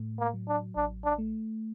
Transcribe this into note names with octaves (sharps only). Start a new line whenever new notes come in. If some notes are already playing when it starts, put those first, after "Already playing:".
Already playing: A2 A3
A#3
F#3
D4
A1 D4
D4
A3